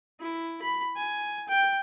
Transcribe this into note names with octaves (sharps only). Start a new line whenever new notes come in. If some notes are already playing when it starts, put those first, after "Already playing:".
E4
B5
G#5
G5